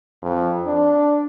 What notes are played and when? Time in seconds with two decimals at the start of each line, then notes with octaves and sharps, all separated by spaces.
0.22 F2
0.65 D4